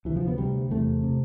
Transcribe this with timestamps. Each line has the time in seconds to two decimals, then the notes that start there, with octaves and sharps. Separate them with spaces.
0.05 D2 E3
0.09 C3
0.16 F3
0.28 B3
0.38 D2 C3 G3
0.70 E2 C3 A3
1.03 C3